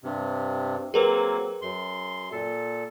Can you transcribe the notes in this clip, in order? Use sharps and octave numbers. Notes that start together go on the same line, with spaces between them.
G2 C3
F#3 A#3 C4 G#4 A#4 B4
F#2 C6
A#2 A4